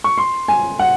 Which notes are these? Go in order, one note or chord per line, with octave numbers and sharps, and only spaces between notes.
C#6
C6
G#5
F#5